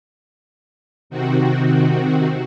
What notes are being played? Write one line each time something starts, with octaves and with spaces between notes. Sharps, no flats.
C3 D#3 C4 F#4